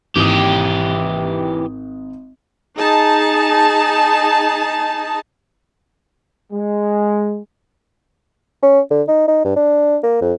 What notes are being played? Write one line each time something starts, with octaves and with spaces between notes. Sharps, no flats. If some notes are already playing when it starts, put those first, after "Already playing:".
G#1 E3 G4 D#6
D#4 G#4 A5
G#3
C#4
D3
D#4
D#4
G2
D4
A#3
F2